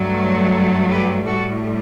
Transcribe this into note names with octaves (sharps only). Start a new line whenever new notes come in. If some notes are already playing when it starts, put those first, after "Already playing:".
Already playing: G2 F#3 A3
G4 B4
A2 G3 F#4 A4